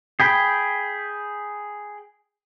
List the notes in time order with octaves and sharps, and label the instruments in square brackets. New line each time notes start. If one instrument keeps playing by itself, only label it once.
[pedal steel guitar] G#4 G5 B5